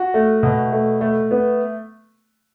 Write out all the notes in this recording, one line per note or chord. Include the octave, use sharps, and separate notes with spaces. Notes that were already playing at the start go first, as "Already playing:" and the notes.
Already playing: F#4
A3
B2
A3
A3
B3